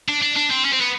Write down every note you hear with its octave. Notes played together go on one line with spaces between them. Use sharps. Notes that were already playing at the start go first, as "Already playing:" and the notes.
D4
D4
D4
C4
C#4
C4
B3